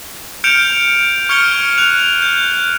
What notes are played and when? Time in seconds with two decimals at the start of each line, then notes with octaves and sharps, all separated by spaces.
0.44 F6 G6 C#7 D7 E7 F7
1.29 C#6 F6 G#6 C#7 F7 G7
1.78 F#6 F7
2.22 G6